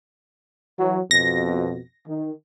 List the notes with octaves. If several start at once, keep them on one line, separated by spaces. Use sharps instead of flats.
E3 F#3
F2 B2 A#6
D#3